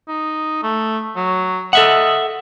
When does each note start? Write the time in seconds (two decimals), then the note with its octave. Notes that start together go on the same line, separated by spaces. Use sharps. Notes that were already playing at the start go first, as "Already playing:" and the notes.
0.08 D#4
0.63 A3
1.16 F#3
1.73 A4 D#5 E5 F#5